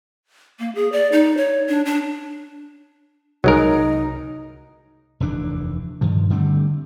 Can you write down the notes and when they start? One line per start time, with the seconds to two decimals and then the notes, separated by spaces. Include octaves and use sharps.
0.59 A#3
0.75 G#4
0.92 D5
1.12 D#4
1.37 C#5
1.69 D4
1.85 D4
3.44 C2 F#3 G#3 D#4 A#4
5.20 F1 D#2 E3 D4
6.01 G2 D#3 F3
6.30 D3 G3 A3 C4